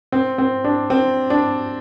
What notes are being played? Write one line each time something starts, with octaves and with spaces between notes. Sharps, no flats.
C4
C4
D4
C4
D4